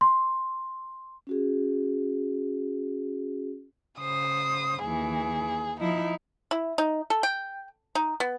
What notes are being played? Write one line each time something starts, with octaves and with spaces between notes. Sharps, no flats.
C6
C#4 F#4 G#4
C#3 C5 D#6
D#2 E3 G#4
F3 D#4 E4
E4
D#4
A4
G5
D#4
B3